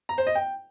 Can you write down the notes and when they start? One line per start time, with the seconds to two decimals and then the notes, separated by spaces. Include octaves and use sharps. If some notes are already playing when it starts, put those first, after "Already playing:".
0.09 A#5
0.18 C5
0.27 D#5
0.35 G5